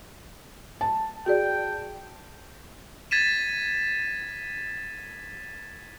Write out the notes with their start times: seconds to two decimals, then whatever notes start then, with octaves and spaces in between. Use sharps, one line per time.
0.81 A5
1.26 F#4 G#4 D5 G5
3.11 G#6 A6 B6 D#7 E7